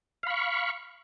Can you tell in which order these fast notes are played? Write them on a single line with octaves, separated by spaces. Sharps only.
F5 B5 C#6